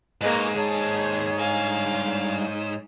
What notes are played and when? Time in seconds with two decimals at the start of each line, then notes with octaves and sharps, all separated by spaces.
0.21 G#2 G#3 A#3 B4 C#5 D#5
0.55 D#2 G#4 C#5 A5
1.39 G2 F5 G#5